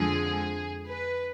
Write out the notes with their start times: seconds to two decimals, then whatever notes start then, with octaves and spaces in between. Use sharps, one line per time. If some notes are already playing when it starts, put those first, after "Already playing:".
Already playing: F2 D3 F3 G#3 G#4
0.85 B4